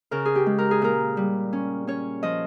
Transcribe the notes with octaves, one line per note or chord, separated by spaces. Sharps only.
C#3 A#4
G#4
G4
G#3
A#4
G#4
A#2 A#4
G3
C#4
C#4 C#5
F3 D#5